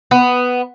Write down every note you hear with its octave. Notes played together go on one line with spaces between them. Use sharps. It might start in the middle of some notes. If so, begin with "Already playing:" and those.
B3